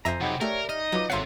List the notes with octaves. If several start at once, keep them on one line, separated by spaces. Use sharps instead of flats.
F2 C5 E5 G#5 A#5 A#6
C3 F#3 D#4 G#4 F#5 G5 B5
A3 G4 A#4 C#5 D5 E5
D#4 D#5 F6
F#3 F4 B4 D6
G#1 C3 A4 C#5 F5 F#5 C6 C7